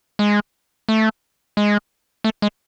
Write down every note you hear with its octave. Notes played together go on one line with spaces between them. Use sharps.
G#3
A3
G#3
A3
G#3